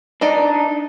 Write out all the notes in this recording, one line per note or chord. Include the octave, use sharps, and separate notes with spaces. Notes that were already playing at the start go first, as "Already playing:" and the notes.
D4 D#4 D5 D#5